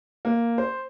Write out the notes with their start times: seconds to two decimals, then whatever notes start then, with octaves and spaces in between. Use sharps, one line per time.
0.25 A#3
0.58 C5